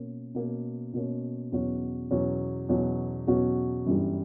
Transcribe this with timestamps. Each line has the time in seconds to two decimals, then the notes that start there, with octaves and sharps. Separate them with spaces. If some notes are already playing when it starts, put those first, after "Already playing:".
Already playing: B2 A#3 C#4
0.34 B2 A#3 C#4
0.93 B2 A#3 C#4
1.52 E2 B2 F#3 C#4 F#4
2.10 E2 B2 F#3 C#4 F#4
2.69 E2 B2 F#3 C#4 F#4
3.27 E2 B2 F#3 C#4 F#4
3.86 G1 F#2 E3 G3